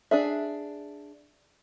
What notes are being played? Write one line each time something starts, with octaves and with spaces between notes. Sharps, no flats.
D4 G#4 E5